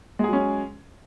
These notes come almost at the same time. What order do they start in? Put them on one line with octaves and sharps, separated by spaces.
G#3 G#4 F#3 C#4